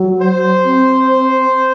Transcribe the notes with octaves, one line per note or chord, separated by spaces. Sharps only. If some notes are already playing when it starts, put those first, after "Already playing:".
Already playing: F#3
C5
C4